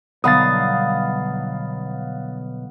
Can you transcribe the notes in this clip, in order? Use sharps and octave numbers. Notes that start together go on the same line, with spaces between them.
B1 D3 G3 B3 D#4 F5 D#6 A6